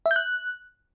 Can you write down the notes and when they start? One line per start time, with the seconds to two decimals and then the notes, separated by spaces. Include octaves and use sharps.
0.06 E5
0.11 G6
0.16 F#6